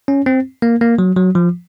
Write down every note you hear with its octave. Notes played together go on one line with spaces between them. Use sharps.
C#4
C4
A#3
A#3
F#3
F#3
F3